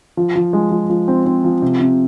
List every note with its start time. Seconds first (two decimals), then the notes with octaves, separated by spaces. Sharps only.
0.17 F3
0.36 F3
0.53 G#3
0.71 F3
0.90 F3
1.08 C4
1.26 C4
1.44 F3
1.62 C3
1.80 C3